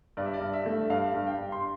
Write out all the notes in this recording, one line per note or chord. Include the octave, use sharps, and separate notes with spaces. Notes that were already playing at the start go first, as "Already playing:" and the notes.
G2 D5
E5
D5
G2
E5
A3
G2 F5
G2
G5
G2
C6